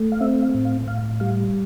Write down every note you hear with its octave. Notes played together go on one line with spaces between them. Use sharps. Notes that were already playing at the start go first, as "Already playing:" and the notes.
Already playing: A3
F5
C4 E5
F5
A2
F5
A2 F5
G3 F5